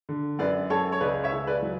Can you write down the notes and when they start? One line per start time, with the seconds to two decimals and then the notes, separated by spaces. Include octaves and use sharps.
0.09 D3
0.39 F#2 B4 D5
0.70 F#2 A4 C#5
0.92 C#5
1.01 C#2 B4 D5
1.24 C#5 E5
1.32 C#2
1.47 B4 D5
1.62 F#3